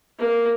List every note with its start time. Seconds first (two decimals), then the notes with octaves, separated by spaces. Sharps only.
0.19 A#3